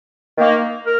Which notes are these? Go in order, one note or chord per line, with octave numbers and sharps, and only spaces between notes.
D#3 A#3
A#4